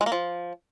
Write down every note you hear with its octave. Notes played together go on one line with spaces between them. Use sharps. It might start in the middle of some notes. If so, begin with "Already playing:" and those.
G#3
A#3
F3